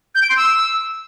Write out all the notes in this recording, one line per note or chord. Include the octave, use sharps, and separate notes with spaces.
G6
D7
C6
E6